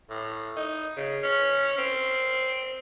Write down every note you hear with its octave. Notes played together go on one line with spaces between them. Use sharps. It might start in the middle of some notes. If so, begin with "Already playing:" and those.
A2
D#4
C#3
C#4
C4